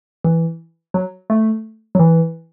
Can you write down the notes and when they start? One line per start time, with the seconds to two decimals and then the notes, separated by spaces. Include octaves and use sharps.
0.24 E3
0.94 F#3
1.30 A3
1.95 F#3
1.99 E3